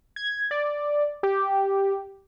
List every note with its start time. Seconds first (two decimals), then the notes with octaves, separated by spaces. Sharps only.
0.16 G#6
0.51 D5
1.23 G4